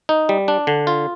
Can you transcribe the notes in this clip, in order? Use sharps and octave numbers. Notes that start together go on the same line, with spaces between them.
D#4
G3
D4
D3
F4